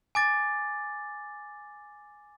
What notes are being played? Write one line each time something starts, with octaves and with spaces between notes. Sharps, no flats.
G#5 D6 A6